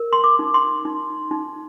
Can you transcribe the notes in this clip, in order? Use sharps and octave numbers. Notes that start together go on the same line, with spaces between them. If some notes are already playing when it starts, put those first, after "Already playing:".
Already playing: A#4
C6
D6
D#4
C6
D#4
D#4